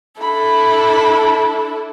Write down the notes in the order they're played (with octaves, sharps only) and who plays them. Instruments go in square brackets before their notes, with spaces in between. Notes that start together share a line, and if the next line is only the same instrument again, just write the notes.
[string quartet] D4 E4 A4 [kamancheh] B5